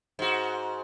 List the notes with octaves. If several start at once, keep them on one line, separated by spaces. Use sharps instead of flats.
G#2 F#4